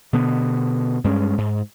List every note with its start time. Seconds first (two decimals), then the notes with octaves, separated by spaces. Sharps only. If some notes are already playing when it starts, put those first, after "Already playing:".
0.13 B2 D3 B3
1.04 G2 G#3 C#4
1.38 G#2